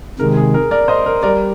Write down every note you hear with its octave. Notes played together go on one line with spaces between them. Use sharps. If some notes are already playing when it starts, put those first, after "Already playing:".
C3 D#3 G#3 A#4
G#4
A#4
A#4 D5
C5 D#5
A#4
G3 A#4 D5